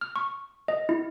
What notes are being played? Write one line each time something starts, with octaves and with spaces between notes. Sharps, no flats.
F6
C#6
D#5
E4